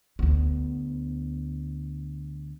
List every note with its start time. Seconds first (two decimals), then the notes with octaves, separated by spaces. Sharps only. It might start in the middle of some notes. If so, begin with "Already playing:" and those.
0.19 D2 B3